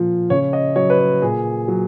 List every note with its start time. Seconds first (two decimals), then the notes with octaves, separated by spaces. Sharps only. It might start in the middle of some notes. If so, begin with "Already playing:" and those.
Already playing: A#2 F3
0.30 C#3 C#5
0.53 D#5
0.76 F#3 C#5
0.90 B4
0.99 C#5
1.22 A#2 G#4
1.68 F#3